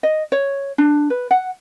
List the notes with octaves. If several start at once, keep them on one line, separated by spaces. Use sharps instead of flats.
D#5
C#5
D4
B4
F#5